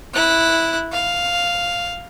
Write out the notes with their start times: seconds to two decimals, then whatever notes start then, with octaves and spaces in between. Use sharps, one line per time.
0.14 E4 F#6
0.92 F5